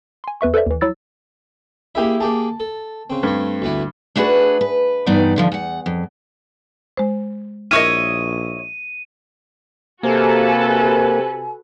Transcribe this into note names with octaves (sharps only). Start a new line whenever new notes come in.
G#5 C6
E2 B4 E5 C#6
A4 B4 C5 D5 E5
D#2 E3
F#3 E4 E6 A6
A#3 E4 G4 G#4 E5
A#3 G4 G#4 A5
A4
C#3 C4
G2 A3 C4
D2 B3 E4
A3 D4 F#4 G#4 B4
B4
G2 E3 B3 D#4 D5 G5
E2 D3 F3
E2 F#5
F2
G#3 C5
A#1 E4 A#4 C#5 D#5 E5 F6 D#7
C3 A#3 F#4 A4 B4 G#5